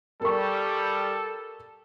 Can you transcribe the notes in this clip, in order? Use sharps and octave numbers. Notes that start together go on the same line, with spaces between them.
G3 A4 A#4 C#6